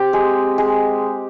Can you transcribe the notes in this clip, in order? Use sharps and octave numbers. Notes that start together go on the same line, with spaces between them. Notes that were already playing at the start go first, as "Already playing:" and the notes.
Already playing: C4 G4
G#3
G#3